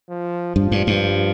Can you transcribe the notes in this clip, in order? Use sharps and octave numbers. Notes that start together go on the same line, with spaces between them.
F3
G2 F3
G2
G2